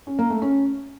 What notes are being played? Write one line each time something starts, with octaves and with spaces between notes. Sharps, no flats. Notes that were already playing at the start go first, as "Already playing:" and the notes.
C#4
A#3
A3
C#4